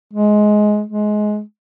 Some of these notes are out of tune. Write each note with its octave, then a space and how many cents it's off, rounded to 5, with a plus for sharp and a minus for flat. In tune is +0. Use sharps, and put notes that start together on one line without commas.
G#3 +15
G#3 +20